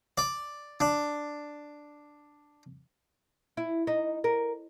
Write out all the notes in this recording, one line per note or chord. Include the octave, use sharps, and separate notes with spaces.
D5
D4
E4
D#4
A#4